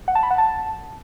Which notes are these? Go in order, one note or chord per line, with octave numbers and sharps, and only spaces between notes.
F#5
A5
B5
F#5
A5